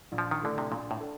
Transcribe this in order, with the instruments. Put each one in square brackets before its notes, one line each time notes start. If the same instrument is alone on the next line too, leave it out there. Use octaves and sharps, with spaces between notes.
[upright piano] A#1
[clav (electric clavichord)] F3
D#3
[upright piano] A2 A3 D4 A4 [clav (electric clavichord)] D3
[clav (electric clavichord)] C3
[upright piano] A#1 [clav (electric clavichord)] A#2
[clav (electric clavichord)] A2
[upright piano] D4 A4